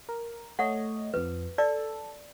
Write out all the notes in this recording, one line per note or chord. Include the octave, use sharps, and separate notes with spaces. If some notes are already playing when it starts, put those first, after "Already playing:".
A#4
A3 C#5 D#5 F#5
F2 F3 B4
A4 D5